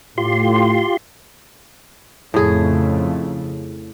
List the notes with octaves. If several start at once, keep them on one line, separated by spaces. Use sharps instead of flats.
A2 F4 G4 C6
F2 A2 C#3 A3 G#4